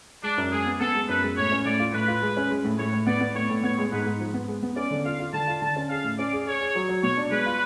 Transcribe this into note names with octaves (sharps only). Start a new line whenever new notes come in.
G#3 D4
F#2
G#3 G#4
B3
B3 A4
G#3
F#2 B4
G#3
A2 C#5
C#4
A2 D5
F4
A2 B4
F4
G#3
C#4
G#3
A2
A2 C#5
A2
B3 D5
B3
A2 C#5
A2
B3 C#5
G#3
G#2 B4
G#2
F3
B3
G#3
B3
C#4 D5
D3
F4 F5
F4
D3 A5
F4
D3 A5
C#4
G#4 F5
A2
C#4 D5
G#4
G#4 C#5
G#4
F#3
F#3
B2 C#5
D4
G#3 B4
F4